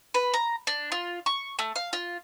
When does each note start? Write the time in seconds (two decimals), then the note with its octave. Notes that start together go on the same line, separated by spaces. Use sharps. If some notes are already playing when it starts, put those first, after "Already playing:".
0.14 B4
0.34 A#5
0.67 D4
0.92 F4
1.26 C#6
1.59 A3
1.76 F5
1.93 F4